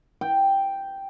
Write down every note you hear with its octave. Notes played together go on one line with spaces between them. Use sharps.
G5